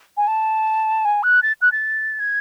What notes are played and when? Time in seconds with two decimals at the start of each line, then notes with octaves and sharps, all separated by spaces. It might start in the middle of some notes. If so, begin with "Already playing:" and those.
0.17 G#5
0.27 A5
1.05 G#5
1.23 F#6
1.43 A6
1.62 F#6
1.72 A6
2.20 G#6